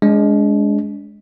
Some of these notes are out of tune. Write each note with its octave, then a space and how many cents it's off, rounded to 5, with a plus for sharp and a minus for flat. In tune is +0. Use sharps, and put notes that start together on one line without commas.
G#3 +0 D4 -40